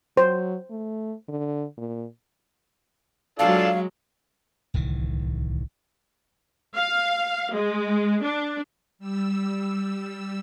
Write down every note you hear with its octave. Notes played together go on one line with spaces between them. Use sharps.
F#3 C5
A3
D3
A#2
F#3 G#3 D4 F4 A4 F5
D1 C2 D#3 E3
F5
G#3
D4
G3 E6